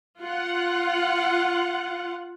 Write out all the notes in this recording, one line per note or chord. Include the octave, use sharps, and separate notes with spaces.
F4 F#5